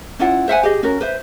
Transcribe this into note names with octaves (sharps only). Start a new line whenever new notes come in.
C#4 E4 F4 F#5
C5 E5 F#5 G#5
G4 G#4 D#5
C#4 F#4 A#4
B4 C5 E5